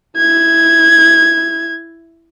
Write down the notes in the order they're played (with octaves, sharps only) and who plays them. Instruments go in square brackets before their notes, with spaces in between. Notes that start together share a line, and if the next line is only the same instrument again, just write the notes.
[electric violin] E4 G#6